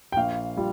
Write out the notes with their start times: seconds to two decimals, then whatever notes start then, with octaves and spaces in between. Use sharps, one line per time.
0.12 G5
0.16 A#1 F5
0.57 G3 F4